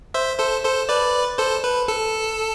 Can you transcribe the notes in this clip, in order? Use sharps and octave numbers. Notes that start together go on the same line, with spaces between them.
C5 E5
A4 C5
A4 C5
B4 D5
A4 C5
B4
A4